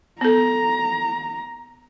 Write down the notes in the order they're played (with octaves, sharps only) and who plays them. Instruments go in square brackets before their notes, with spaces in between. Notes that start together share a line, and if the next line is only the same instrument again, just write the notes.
[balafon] B3 A4 [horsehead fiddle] A#5